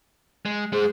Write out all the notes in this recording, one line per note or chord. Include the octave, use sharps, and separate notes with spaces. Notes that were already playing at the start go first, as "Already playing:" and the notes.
G#3
G#3 G#4 C5